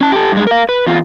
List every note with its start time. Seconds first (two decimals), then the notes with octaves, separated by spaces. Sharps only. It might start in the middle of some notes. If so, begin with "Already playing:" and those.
0.01 C#4 A5
0.12 G4 A4
0.32 G2 G#3
0.47 A#4 F5
0.69 B4
0.86 E2 F4